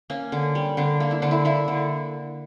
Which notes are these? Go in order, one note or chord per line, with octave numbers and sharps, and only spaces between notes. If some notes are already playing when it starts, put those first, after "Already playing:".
A#3 C#4
D3
G3
D3 D4
A#3
E4
D3 D4
E4
A#3 E4
D3